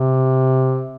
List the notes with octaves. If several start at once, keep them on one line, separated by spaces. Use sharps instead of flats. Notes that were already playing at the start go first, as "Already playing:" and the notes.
Already playing: C3